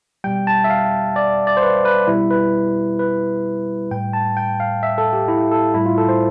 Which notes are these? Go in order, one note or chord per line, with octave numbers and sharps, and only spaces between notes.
B2 G3 G5
A5
E5
F5
D5
D5
C5
B4
B4
B2 G3 E4
B4
B4
A2 G3 G5
A5
G5
F5
E5
A4
G4
E4
A4
A2 G3 E4
F4
A4
C5